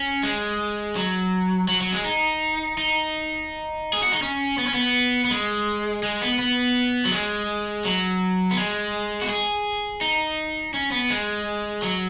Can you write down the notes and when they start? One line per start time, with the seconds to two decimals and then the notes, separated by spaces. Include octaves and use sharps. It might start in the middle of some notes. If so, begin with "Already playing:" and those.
Already playing: C#4
0.23 G#3
0.96 F#3
1.68 F#3
1.81 F#3
1.93 G#3
2.04 D#4
2.78 D#4
3.93 G#4
4.03 F#4
4.12 D#4
4.22 C#4
4.58 B3
4.67 C#4
4.74 B3
5.25 B3
5.31 G#3
6.03 G#3
6.21 B3
6.39 B3
7.05 F#3
7.11 G#3
7.85 F#3
8.51 B3
8.57 G#3
9.22 F#4
9.29 G#4
10.01 D#4
10.74 C#4
10.92 B3
11.10 G#3
11.82 F#3